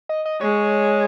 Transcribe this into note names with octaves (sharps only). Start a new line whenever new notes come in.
D#5
D#5
G#3 C#5